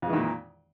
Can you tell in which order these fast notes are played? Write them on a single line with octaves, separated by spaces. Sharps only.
F2 G#3 E3 D#3 A#2